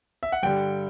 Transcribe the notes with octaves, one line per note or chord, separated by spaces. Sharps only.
E5
F#5
G2 D3 G3 G5